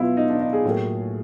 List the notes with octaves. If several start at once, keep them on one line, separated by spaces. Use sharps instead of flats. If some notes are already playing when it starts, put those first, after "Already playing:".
Already playing: B2 F#3 B3 E4 F4
D#4
D4
D#4
G#4
A2 F#3 A#3